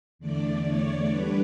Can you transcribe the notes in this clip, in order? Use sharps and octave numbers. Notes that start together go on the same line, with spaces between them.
E2 D3 A3 D5
C#5
D3 G3 D4 B4